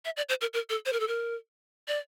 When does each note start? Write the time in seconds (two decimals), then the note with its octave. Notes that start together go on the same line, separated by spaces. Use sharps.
0.05 E5
0.17 D5
0.29 C5
0.41 A#4
0.54 A#4
0.70 A4
0.86 C5
0.93 A#4
1.00 A4
1.08 A#4
1.88 D5